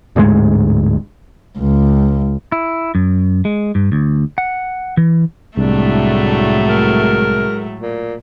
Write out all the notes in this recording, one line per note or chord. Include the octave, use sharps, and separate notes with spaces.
D1 D2 G#2 G#3
C#2
E4
F#2
G#3
G2
D2
F#5
E3
C2 A2 F#3 G#3 A3 D4
A#4
A#2